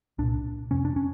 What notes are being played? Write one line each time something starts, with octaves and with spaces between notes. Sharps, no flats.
C2 A#2 D4
F2 C3 C#4
D4
C#4